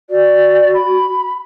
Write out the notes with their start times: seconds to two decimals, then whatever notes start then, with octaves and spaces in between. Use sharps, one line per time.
0.10 F#4 D5
0.74 B5